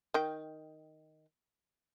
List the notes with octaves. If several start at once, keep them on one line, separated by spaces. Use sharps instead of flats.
D#3 G5